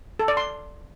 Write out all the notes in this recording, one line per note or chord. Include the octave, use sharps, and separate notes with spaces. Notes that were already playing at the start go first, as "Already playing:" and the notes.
A4
D5
C6